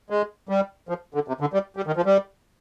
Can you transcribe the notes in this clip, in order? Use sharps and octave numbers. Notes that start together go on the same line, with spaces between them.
G#3
G3
F3
D3
C3
D3
G3
G3
D#3
F3
G3